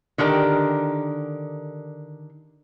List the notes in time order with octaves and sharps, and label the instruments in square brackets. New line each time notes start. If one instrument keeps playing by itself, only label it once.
[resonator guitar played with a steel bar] D3 D#3 D4 G4 A#4